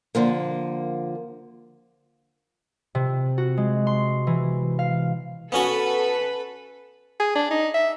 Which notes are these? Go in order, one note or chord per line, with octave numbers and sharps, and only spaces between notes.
D3 F3 A#3
C3
F#4
G#3
C6
E3
F5
B3 C#4 F#4 A4 B4 B5
G#4
D4
D#4
E5